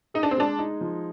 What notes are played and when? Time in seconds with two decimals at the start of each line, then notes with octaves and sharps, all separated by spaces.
0.14 D#4 G#4
0.23 D4
0.31 C4
0.37 G#3 D4
0.59 D#4
0.81 F3